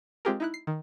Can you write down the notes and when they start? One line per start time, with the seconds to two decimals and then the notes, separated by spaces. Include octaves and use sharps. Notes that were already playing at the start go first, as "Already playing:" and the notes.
0.25 G#3 C4 F4 G4 G#4 A#4
0.40 D#4 E4 F#6
0.54 C7
0.67 D#3